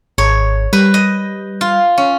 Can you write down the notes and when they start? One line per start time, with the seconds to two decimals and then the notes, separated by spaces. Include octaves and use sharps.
0.18 G#1 C#5
0.73 G3 B4
0.94 D#5
1.61 F4
1.98 C#4